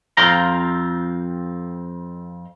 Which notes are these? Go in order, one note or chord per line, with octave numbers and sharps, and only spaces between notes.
F2 C4 F4 F5 G5 A#5